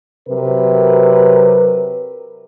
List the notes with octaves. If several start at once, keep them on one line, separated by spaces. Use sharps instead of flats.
C3 F#3 A#4 B4